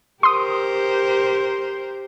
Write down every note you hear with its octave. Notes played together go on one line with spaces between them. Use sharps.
G4 A#4 C5 C6 D#6